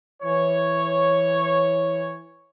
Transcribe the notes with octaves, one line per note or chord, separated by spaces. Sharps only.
E3 C#5